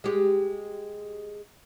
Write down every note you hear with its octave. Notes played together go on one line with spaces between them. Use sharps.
G#3 G4